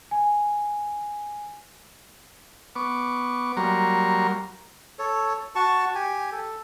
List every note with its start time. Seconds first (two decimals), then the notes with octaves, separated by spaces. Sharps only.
0.11 G#5
2.75 B3 C#6 D6
3.57 F#3 G3 A#3 A#5 C6 C#6
4.99 A4 C#5
5.55 F#4 A5 C#6
5.95 G4 G#5
6.32 A4